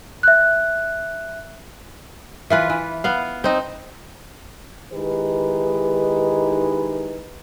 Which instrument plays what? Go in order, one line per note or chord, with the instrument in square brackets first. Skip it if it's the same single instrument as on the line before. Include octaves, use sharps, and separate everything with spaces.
[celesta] E5 F#6
[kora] E3 F4 B4
E3
B3 F5
C4 D#4
[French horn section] D#3 G#3 D#4 E4 G4 B4